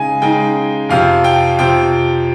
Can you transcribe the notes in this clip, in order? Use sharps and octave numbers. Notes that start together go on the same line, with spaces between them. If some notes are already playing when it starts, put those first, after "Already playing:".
Already playing: C#3 G#3 D#4 G#5
C#3 G#3 D#4 G5
F2 C3 F3 F5
G5
F2 C3 F3 G5